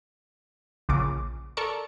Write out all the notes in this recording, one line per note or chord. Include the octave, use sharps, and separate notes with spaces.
A#1 C#3 D6
A4 A#4 D5 C#6